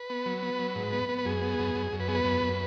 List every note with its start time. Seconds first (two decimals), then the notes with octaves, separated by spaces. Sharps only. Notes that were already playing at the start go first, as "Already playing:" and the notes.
Already playing: B4
0.10 B3
0.26 F#3
0.43 B3
0.59 F#3
0.76 G#2
0.93 B3
1.09 B3
1.18 B4
1.25 F#2 G#4
1.42 B3
1.59 F#2
1.75 F#2
1.92 F#2
2.00 B4
2.08 B3 G#4
2.15 B4
2.25 F#2
2.42 F#2